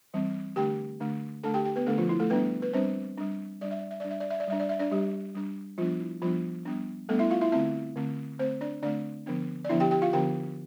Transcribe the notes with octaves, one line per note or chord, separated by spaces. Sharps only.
E3 G3 C4
D3 A3 D4 G4 G5
D3 A3 D4
D3 A3 D4 A4 A5
G4 G5
G4 G5
B3 B4
D3 A3 D4 A4
F3 F4
E4
A3 A4
G3 B3 D4 B4
B4
G3 C4 D4 C5
G3 D4
G3 D4 D5
E5
D5
E5
G3 D4 D5
E5
D5
E5
D5
G3 D4 E5
D5
E5
D4 D5
G3 D4 G4
G3 D4
F3 G3 B3 D4 F4
E4
F3 G3 B3 D4 F4
G3 B3 D4
G3 A3 B3 D4 A4
E4 E5
F4 F5
E4 E5
D3 A3 C4 E4 E5
D3 A3 C4
D3 A3 C4 C5
D4 D5
D3 A3 C4 D4 D5
D3 F3 B3 D4
D5
D3 F3 B3 D4 E4 E5
G4 G5
G4 G5
F4 F5
D3 F3 B3 D4 G4 G5